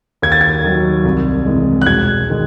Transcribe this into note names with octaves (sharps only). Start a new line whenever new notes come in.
D#2 G#6
A6
G#6
D#3 F#3
C2
C3 E3 G#3
F#6
E1 G#6
D#3 G#3